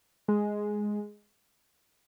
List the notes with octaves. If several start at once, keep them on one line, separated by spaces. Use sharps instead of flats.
G#3